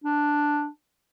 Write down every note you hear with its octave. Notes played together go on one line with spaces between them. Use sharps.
D4